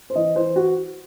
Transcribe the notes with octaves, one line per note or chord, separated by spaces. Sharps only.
C5
E3 D#5
E3 C5
F#4